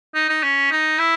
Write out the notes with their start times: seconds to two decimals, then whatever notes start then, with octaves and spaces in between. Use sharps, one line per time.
0.15 D#4
0.29 D#4
0.43 C#4
0.72 D#4
0.99 E4